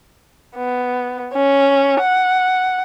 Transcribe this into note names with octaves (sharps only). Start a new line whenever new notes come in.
B3
C#4
F#5